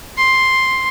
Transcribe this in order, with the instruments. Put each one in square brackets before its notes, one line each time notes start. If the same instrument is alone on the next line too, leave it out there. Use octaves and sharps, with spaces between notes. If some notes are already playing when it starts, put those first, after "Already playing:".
[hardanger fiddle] C6